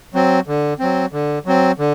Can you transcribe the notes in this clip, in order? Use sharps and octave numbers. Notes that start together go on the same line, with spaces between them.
F#3 C4
D3
F#3 C4
D3
F#3 C4
D3